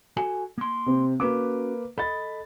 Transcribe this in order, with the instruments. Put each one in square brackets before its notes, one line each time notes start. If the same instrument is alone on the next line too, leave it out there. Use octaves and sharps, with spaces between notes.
[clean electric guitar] F#4 A4 G#5
A#3 C6
[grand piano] C3 C4
[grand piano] A#3 B4 D6 [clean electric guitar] C#4 F#4 G4
[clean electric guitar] A4 D#5 [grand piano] B5 A6